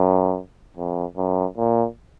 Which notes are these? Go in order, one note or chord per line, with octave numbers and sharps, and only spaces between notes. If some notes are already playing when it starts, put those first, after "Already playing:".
Already playing: F#2
F2
F#2
A#2